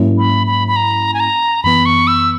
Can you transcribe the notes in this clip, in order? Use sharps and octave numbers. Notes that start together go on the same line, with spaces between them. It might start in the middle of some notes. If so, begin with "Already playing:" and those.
Already playing: G#2 F#3 A#3 C#4 E4
B5
B5
B5
A#5
G#5
A#5
F#2 E3 B3 B5
C#6
E6